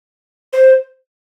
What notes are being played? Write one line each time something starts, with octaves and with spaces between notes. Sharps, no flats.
C5